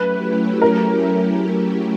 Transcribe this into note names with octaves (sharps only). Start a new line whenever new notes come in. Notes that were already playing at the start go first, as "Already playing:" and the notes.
Already playing: F#3 A3 C#4 E4 G4 B4
A#4